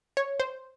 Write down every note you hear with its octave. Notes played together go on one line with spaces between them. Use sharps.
C#5
C5